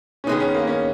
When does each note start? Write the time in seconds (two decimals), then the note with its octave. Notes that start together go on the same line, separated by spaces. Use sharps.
0.24 C#4
0.27 D#3 G#3 B3 D#4
0.40 C#4
0.54 A#3
0.67 C#4